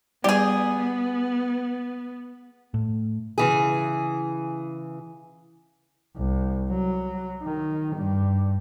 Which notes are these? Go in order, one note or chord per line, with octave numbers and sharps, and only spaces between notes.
G3 B3 G4 G#4 D5
A2
C#3 E3 G#4
C2
F#3
D#3
G2